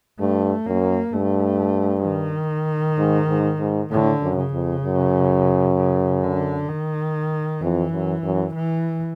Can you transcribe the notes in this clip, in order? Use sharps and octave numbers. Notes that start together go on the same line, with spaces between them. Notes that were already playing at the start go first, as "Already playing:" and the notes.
G2 A3
F#2 A#3
G2 A3
D#3
G#2
G#2
G#2
A2 D3
F#2
C#3
F2
F#2
C#3
D3
D#3
F2 E3
F#2
F#2
E3